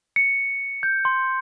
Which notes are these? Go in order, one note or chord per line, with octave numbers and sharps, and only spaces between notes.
C#7
G6
C6